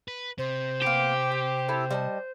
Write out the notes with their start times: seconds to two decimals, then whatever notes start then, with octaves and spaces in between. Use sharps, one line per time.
0.08 B4
0.38 C3 C5
0.82 A#3 B3 G4
1.32 C4
1.68 E4 A4 A5
1.91 G3 D#5 A5